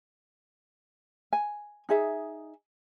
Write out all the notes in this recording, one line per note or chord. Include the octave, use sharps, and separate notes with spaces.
G#5
D#4 G#4 E5